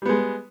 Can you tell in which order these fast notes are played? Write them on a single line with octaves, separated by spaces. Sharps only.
G3 B3 G#3